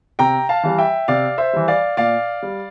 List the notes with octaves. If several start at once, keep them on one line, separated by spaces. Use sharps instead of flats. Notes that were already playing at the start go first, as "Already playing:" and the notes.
C3 G5 A#5
F5 A5
E3 G3
E5 G5
C3 D5 F5
C5 E5
E3 G3
D5 F5
A#2 D5 F5
G3